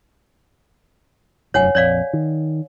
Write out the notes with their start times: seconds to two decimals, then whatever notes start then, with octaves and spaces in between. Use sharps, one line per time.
1.54 F1 F#2 C#5 F#5 G#5
1.75 A#1 F2 C#5 D5 F5
2.13 D#3